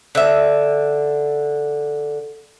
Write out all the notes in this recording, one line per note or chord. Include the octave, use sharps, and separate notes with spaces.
D3 E5